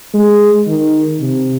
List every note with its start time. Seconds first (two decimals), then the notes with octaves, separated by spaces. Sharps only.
0.14 G#3
0.68 D#3
1.20 C3